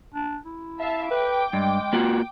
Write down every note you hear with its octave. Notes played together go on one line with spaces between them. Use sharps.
D4
E4
E5 F5 A5
B4 G5 D6
G2 G#3
A#3 F4 F#4